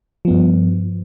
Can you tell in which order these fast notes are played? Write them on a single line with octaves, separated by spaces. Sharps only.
F3 B3 G2